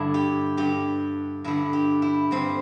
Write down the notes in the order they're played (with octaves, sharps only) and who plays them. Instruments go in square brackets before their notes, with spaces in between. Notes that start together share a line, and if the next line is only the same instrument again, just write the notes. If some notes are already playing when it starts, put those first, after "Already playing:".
Already playing: [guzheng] G2 D3 D4 E4
G4
G2 D3 G4
G2 D3 E4
G4
E4
G2 D3 C4